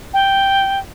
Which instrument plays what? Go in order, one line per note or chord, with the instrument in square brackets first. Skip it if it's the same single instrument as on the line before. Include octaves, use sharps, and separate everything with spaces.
[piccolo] G5